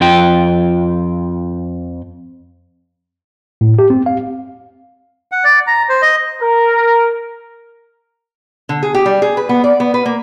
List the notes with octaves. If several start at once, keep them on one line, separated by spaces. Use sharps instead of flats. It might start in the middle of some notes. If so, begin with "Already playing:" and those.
F2 F4 G5
A2
G4
C4
F5
F#5
D5
A#5
C5
D#5
A#4
D3
G#4
G4
G3
G#4
B4
B3
D5
B3
B4
A#3